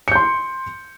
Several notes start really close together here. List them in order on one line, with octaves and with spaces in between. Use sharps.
C#7 G6 C6